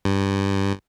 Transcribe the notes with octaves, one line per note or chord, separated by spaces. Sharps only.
G2